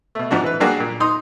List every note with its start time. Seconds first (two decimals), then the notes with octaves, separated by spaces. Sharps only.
0.15 B2 A3
0.31 G#2 F3 D4 F#4
0.44 E3 B4
0.60 F#3 G3 A#3 D4 F#4 G#4
0.80 A#2
1.00 D#4 C6 D#6